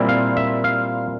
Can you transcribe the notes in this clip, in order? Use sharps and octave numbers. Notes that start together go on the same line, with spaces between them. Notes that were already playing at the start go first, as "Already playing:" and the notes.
Already playing: A#2 G3 C4 E4
F5
E5
F5